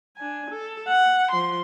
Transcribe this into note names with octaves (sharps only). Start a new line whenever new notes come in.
D4 G#5
A4
F#5
F3 C6